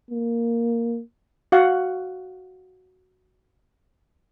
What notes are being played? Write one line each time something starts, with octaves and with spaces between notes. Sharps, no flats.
A#3
F#4 F5 F#5